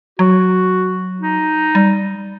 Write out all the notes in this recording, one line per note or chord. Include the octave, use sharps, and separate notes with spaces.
F#3 F#4
D#4
G3